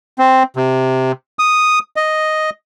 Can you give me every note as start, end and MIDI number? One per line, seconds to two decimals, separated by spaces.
0.19 0.43 60
0.56 1.12 48
1.39 1.79 87
1.96 2.50 75